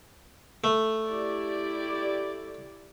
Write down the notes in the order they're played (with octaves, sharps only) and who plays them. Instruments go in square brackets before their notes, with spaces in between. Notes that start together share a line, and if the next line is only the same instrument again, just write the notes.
[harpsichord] A3
[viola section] E4 G4 D5